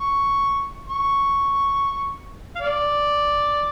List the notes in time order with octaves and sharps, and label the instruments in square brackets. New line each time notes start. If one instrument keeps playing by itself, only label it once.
[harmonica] C#6
C#6
F5
D5